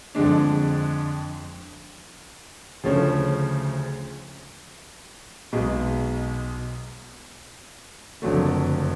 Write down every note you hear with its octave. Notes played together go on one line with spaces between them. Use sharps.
F2 D3 G#3 D4
D2 C#3 F3 A3 C#4
B1 B2 G#3
F#1 F2 D3 F#3 A3